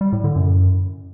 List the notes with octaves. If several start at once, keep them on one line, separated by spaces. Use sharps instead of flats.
G3
A2
D3
F#2